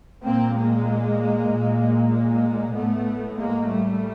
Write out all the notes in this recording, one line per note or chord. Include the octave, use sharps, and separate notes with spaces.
A#2 A#3 C4
G#3 A#3
A#2
G#3 A#3
A2 A3 B3
G#3 A#3
G3 A3